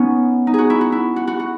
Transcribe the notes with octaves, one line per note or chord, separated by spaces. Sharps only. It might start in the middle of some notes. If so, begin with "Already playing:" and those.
Already playing: B3 C#4 D#4
D#4
F#4 G#4
E4
F#4
E4
F#4
F#4
F#4